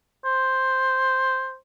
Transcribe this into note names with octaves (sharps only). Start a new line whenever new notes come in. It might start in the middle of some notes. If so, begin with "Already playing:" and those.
C5